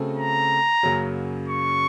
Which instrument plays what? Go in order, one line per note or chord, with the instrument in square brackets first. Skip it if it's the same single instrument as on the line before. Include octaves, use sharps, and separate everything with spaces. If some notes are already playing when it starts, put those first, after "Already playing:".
Already playing: [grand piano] C#3 A3 C4 F#4 A4
[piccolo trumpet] A#5
[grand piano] F#2 C#3 F#3 A#3
[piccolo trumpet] C#6